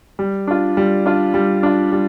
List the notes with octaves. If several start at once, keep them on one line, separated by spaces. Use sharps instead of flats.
G3
D4 F4
G3
D4 F4
G3
D4 F4
G3